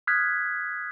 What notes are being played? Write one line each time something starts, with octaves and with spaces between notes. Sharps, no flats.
D#6 F6 F#6 G#6 B6